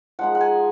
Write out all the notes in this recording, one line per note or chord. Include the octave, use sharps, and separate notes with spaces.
F3 G#3 D#4 F#5
F#5
G#5